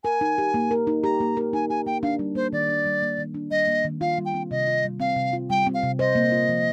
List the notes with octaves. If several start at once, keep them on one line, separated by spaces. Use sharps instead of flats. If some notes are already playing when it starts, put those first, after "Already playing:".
A#4 G#5
D#4
G4
A#3
A#4
D#4
G4 A#5
A#3
A#4
D#4 G#5
G4 G#5
A#3 G5
D4 F5
G3
A#3 C5
D#3 D5
D4
G3
A#3
D#3
D4
G3 D#5
A#3
D#3
F4 F5
G3
G5
C4
C3 D#5
F4
G3
C4 F5
C3
F4
G3 G5
C4
F5
C3
C5 D#5
A#3
F4
F3